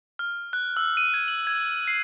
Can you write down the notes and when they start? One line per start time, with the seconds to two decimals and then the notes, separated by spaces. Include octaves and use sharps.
0.19 F6
0.53 F#6
0.77 E6
0.97 D#7
1.14 G#6
1.28 F#7
1.47 G#6
1.88 C7